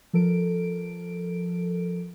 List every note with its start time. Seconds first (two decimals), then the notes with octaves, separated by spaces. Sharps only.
0.13 F3 A4 A#4 D7